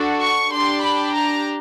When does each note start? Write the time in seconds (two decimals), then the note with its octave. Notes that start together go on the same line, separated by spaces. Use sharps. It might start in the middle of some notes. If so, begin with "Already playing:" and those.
Already playing: D4 F#4 A4
0.21 C#6
0.51 D4 G4 C6
0.82 B5
1.13 A#5